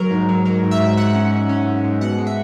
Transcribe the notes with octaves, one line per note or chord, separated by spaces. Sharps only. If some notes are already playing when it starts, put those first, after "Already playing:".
Already playing: F#3 A#4
G#2
F#3
F#3 A#4
G#2
E5
G#2
G#2 F#5
C#4
G#2
C#4
G#2
G#2
B2 F#5
G#3
E5